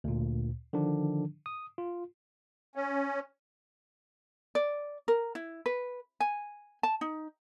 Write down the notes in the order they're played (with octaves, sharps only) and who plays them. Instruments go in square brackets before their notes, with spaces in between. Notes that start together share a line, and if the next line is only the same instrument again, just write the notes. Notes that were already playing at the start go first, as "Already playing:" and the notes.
[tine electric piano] D2 A#2
D3 D#3 F3 D4
D#6
F4
[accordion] C#4
[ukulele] D5
A#4
E4
B4
G#5
A5
D#4